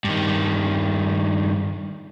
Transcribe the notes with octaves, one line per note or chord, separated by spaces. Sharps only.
G2 D#3